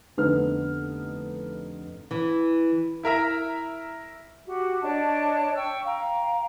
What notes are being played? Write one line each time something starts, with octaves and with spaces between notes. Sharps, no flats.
F1 D3 B3 D#4 B4 F6
E3
E4 A#4 E5 A#5
F#4 G4
D4 C#5 D#5 A5
G5 C#6 E6
F5 G5 A#5